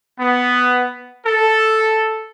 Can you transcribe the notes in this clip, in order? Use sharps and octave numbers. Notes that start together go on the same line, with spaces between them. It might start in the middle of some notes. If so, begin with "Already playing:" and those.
B3
A4